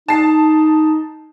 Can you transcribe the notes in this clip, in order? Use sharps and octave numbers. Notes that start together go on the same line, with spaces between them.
D#4 A5 C7